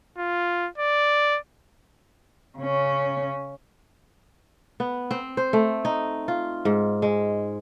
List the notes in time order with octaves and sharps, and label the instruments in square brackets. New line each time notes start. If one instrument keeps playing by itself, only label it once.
[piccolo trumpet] F4
D5
[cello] C#3 C#4
[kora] B3
C4
C5
A3
D#4
F4
G#2
G#3